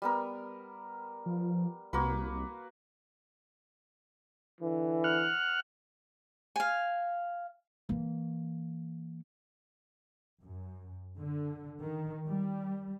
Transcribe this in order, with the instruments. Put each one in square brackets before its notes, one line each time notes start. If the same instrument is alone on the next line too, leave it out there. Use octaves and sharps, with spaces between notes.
[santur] G3 B3 A#4
[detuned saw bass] F3
[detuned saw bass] C2 [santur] A#3 F#4 B4
[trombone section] D3 E3
[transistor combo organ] F#5 F6
[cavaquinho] F5 G#5
[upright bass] E3 A#3
[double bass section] F#2
D3
D#3
G3